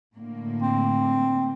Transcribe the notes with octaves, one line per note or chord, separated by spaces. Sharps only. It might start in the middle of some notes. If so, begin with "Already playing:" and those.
A2 D3 A#3
C4